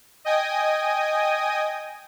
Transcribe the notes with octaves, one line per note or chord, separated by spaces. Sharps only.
D#5 G5 G#5 D#6